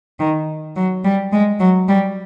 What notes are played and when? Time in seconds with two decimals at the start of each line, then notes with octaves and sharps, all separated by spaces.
0.19 D#3
0.76 F#3
1.04 G3
1.32 G#3
1.60 F#3
1.88 G3